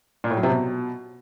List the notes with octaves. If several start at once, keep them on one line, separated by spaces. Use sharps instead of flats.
A#2
A2
F#3
C3
B2